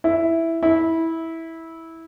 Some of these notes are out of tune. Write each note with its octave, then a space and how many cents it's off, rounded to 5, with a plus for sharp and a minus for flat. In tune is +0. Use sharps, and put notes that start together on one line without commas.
E4 +0
E4 -15